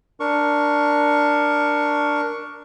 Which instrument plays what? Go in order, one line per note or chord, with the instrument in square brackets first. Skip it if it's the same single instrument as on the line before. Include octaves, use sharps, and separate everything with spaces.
[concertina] D4 A#4 C#6